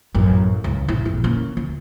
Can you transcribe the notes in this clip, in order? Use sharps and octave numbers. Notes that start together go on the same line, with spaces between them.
A1 F#2
C#2
A1 E4
A#1 F2
A#3 C#4
D2